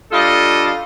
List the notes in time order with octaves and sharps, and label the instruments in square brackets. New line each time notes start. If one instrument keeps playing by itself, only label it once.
[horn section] G3 D4 F4 A4 D#5